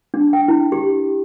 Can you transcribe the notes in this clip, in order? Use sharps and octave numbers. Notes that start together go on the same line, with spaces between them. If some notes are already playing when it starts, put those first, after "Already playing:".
D4
G5
E4
G4